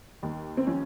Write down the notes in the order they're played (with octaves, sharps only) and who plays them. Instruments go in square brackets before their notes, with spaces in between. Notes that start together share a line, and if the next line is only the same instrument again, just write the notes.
[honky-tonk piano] D#2
C4
F3 C#4